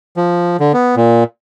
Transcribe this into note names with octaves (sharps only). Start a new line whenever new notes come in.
F3
D3
B3
A#2